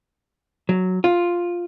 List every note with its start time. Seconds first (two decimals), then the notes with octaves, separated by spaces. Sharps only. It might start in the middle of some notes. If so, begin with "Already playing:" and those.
0.69 F#3
1.04 F4